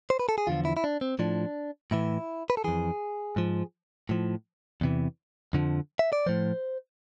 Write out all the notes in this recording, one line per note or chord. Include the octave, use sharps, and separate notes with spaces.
C5
B4
A4
G#4
E2 D3 F3 F4
E4
E4
D4
C4
A2 F3 D4
A2 E3 E4
B4
A4
F2 E3 G#4
G#2 F3
A2 F3
E2 C3 E3
F2 D3 F3
E5
D5
A2 F3 C5